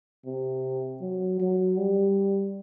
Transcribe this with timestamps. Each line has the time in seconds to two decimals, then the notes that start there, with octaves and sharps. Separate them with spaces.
0.25 C3
1.01 F#3
1.39 F#3
1.77 G3